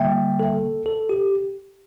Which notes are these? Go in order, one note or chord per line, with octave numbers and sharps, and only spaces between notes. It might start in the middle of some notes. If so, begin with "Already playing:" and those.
Already playing: D3 G3 A#3 E5 G5
A4
A4
G4